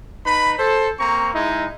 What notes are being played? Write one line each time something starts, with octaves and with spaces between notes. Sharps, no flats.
D#4 B4 B5
A4 C5
A#3 C4 A#5 C#6
G#3 D#4 E4